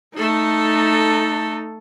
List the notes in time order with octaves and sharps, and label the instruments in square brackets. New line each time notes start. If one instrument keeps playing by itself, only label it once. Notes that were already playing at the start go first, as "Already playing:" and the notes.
[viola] A3 A4 [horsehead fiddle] D#4